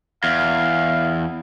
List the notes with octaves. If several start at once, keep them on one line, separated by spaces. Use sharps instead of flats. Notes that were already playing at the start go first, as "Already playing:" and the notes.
E2 F5